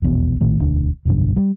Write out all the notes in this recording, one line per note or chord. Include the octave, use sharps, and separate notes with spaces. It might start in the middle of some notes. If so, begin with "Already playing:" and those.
D#1 A#1 E2 B2
A#1 A2 D#3 A3
E1 D2 D4
F1 B1 G2 D3
G3